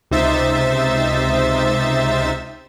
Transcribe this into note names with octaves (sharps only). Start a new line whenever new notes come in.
C#2 C3 D#4 C5 E5 A6